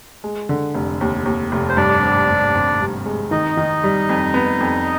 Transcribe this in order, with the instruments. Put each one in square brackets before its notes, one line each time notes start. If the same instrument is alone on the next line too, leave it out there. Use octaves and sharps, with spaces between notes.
[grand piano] G#3
D3
F1
D#2
D#2
F1
[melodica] C5
[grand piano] G2 [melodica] D4 D5
[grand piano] G#1
G#1
G#1
G2
G#3
[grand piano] D#3 [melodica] D#4 D#5
[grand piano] D#3
G3
F2
B3
F2